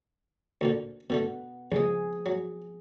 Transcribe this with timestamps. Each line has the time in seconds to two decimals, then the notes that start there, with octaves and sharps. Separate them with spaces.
0.61 D2 A#2 D3
1.10 B2 D3 A3 B3
1.72 C#2 F3 G#3 G#4
2.26 F#3